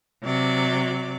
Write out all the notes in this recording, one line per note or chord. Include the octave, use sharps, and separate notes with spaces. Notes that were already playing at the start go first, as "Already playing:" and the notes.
C3 F#3 D5